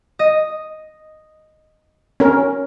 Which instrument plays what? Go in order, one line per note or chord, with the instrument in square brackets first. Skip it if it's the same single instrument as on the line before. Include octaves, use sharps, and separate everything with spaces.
[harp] D#5
[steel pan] C#4 A#4